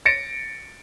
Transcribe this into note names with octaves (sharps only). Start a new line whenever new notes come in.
A6 A#6 C#7 D7